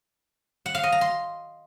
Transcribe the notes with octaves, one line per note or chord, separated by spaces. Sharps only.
F#5
F5
D#5
A#5
C6